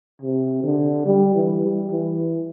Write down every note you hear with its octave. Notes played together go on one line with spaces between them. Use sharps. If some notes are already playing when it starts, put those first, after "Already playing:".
C3
D3
G3
E3
G3
E3